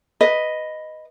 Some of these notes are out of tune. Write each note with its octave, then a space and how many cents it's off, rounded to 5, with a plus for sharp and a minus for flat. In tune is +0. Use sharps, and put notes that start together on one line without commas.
B4 +0 D#5 +0